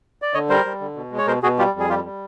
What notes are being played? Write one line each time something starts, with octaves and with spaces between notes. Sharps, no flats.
D5
D3 C#5 D#5
G3 A#4 C5
G3
D3
B2
G#3
C#5
B2 A#4 C5
B2 F#4 G#4
G3 F4 G4
F2
G#4
G3 F4 G4
G3